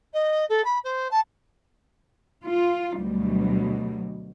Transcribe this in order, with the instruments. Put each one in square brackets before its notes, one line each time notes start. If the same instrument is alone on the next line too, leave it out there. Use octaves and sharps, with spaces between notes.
[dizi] D#5
A4
B5
C5
A5
[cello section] F4
D2 B2 F#3 G3